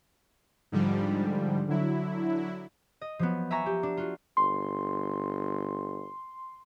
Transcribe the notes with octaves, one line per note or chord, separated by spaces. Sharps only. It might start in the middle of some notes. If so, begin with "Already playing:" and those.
G#2 D3 F3 G3
D3 F#3 E4
D#5
F3 F#3 B3
E5 G#5 A#5 C#6 A#6
G4
D4
F4 F#4
G1 C6